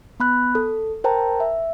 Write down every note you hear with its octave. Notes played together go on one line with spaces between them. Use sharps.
B3 B5 F#6
A4
A#4 C5 G5 A5 A#5
E5